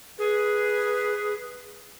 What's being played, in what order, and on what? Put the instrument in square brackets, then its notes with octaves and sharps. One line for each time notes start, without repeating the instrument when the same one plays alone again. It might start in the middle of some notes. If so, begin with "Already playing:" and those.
[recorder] G#4 [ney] B4